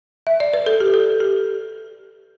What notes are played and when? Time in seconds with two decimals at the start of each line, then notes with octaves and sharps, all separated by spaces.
0.27 E5
0.40 D5
0.54 B4
0.66 A4
0.80 G4
0.94 A4
1.20 G4